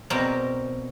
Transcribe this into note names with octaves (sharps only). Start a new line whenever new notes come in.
B2 A#3 C4 A#4 D5